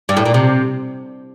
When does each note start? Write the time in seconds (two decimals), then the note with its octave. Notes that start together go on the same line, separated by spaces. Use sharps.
0.09 G2
0.17 A2
0.26 A#2
0.34 C3